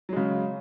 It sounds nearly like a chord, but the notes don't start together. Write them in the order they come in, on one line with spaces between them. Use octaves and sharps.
F#3 G#3 C#3